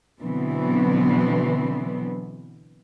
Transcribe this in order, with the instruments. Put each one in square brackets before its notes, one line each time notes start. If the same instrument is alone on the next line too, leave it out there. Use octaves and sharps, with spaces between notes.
[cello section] B2 D3 E3 F#3 B3 C4